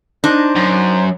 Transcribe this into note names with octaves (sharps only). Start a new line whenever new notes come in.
D4 D#4 C5
F#2